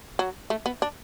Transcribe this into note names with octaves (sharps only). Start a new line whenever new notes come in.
F#3
A3
B3
D4